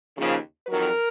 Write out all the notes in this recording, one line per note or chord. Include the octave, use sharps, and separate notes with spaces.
D#2 C#3 F3
F2 D#3 F#3 A#4